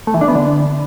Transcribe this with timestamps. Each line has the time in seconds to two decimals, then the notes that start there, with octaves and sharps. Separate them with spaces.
0.07 A3
0.14 E3
0.21 D4
0.28 B3
0.35 D3